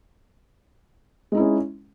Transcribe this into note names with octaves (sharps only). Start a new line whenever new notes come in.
G#3 C#4 D#4 E4